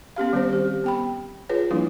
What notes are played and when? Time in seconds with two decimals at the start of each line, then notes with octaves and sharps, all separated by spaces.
0.16 B3 C#4 G4 F5
0.33 D#3 G3 C4 C5
0.53 G4
0.84 B3 G5 B5
1.49 F4 G#4 B4 C#5
1.71 F3 G3 A#3 D4 E4